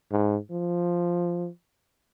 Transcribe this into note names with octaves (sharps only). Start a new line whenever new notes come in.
G#2
F3